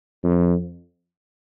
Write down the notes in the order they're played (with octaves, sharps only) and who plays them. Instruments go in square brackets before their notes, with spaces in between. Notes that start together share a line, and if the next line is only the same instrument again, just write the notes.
[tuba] F2